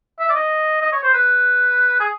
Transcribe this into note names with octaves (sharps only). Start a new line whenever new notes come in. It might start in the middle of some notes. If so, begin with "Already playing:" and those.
E5
D5
D#5
D#5
C#5
C5
B4
G#4